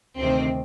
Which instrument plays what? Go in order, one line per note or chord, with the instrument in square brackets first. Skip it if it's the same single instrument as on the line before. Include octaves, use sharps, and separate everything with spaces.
[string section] D2 C3 D#3 C4